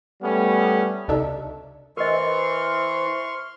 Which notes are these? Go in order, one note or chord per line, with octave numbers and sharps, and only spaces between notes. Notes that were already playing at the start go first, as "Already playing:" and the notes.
G3 A3 B3 C#4
C#2 C3 D4 D#4 A4 E5
E3 A#4 C5 D#5 C6 C#6 F6